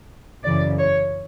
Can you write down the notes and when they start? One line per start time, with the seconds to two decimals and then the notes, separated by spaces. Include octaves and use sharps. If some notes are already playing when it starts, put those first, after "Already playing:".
0.44 F#2 C#3 E3 D5
0.78 C#5